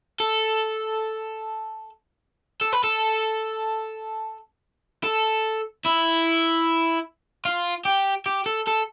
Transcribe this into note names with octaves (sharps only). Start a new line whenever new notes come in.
A4
A4
B4
A4
A4
E4
F4
G4
G4
A4
A4